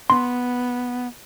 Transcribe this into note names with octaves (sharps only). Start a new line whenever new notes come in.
B3 C6